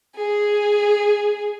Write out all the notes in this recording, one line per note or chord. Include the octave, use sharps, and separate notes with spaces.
G#4